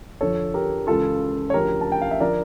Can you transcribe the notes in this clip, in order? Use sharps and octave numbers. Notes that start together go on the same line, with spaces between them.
F2 D3 F3 A4 C#5
G4 A#4
C#2 C#3 E3 F4 A4
C#5
D2 C#3 F3 G4 A#4
A5
G5
F5
E5
D3 F3 A#4 D5